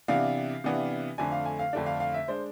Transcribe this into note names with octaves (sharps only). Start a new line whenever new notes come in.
C3 E3 B3 D4 F5
C3 E3 B3 D4
F2 D3 A3 D4 G#5
F5
G#5
F5
F2 D3 A3 D4
F5
F5
E5
G#3 D4 C5